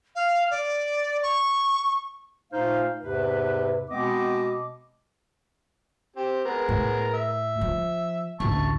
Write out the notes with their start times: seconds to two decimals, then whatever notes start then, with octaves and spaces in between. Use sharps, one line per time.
0.15 F5
0.51 D5
1.23 C#6
2.52 A#2 A3 D#4 C5 F5
3.01 E2 G#2 C3 B4
3.89 B2 G#3 B3 C4 D#5 D6
6.16 C4 G4
6.45 G#3 B3 A#4
6.69 A2
7.14 E5
7.61 F3
8.40 A1 D2 A5 C#6